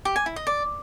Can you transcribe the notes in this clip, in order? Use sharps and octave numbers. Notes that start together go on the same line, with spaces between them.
G4
G#5
E4
D#5
D5